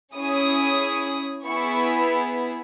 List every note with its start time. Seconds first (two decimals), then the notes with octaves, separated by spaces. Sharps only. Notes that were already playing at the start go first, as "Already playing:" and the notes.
0.16 C#4 E4 G#4 D#6
1.44 B3 E4 G#4 C#6